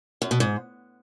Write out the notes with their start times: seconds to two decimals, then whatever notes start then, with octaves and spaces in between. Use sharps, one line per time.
0.22 F#2
0.31 B2
0.40 G#2